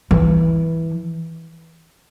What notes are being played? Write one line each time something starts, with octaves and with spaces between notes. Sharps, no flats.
E3